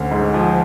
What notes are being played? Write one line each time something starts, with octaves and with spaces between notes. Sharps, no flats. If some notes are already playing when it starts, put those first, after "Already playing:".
Already playing: D2 C#4
G#2
F3